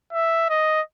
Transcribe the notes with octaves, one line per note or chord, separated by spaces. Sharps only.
E5
D#5